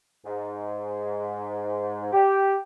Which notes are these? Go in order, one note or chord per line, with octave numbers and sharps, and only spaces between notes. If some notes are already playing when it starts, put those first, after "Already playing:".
G#2
G4